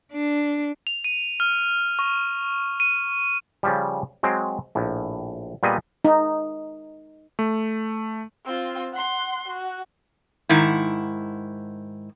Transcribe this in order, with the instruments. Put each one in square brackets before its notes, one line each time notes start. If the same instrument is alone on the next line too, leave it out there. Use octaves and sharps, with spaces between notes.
[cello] D4
[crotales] F7
D#7
F6
C#6
D#7
[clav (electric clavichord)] C#3 F3 G3
F#3 G#3 C4
A#1 A2
A#2 G3 B3 G#4 D#5
[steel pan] D#4
[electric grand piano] A3
[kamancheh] C4 F4
F#5 C6
F#4
[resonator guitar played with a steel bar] G#2 D#3 E4